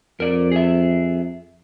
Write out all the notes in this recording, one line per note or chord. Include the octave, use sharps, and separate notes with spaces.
F2 A#4 D5
G#4 E5